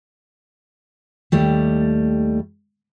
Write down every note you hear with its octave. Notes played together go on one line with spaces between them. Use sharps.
D#2 G3 A3